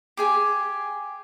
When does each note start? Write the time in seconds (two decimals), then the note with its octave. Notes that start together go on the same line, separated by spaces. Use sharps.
0.17 G4 G#4 G#5